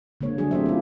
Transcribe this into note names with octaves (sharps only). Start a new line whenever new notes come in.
D3 G#3 A#3 C#5
F#3 D4 G#4
A3 C4 C#4 G4 C5 E5
E4 F4